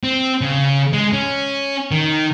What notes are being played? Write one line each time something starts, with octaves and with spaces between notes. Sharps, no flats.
C4
C#3
G#3
C#4
D#3